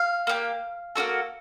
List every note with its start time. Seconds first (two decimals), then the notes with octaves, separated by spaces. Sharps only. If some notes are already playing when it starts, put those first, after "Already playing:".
Already playing: F5
0.27 A#3 D4 G4
0.95 A#3 D#4 F#4 A4